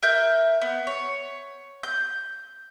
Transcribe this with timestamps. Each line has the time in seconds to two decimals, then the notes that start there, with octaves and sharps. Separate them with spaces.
0.03 A#4 E5 G6
0.61 B3
0.87 C#5
1.83 G6